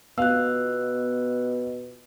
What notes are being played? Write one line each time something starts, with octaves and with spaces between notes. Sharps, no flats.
B2 B3 F4 F5 E6 F#6